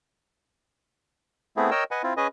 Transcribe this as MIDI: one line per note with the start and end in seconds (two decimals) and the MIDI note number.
1.57 1.70 57
1.57 1.70 59
1.57 1.70 60
1.57 1.70 64
1.57 1.70 68
1.71 1.84 70
1.71 1.84 73
1.71 1.84 75
1.71 1.84 79
1.71 1.84 88
1.91 2.02 71
1.91 2.02 75
1.91 2.02 78
1.91 2.02 80
2.03 2.14 60
2.03 2.14 64
2.03 2.14 65
2.17 2.27 61
2.17 2.27 68
2.17 2.27 71
2.17 2.27 75
2.17 2.27 80